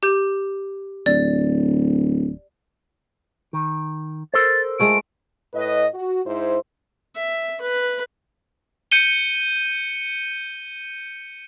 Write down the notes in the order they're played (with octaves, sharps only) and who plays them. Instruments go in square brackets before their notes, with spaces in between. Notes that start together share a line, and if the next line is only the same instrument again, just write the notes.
[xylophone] G4 G6
[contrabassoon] D1 [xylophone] D5
[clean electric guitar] D#3
[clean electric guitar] A4 A#4 C5 [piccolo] A6
[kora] G#3 A3 F4 [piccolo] D7
[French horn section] A2 B4 D#5
F#4
G#2 E4 C5
[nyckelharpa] E5
B4
[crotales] G6 C#7 D#7 G7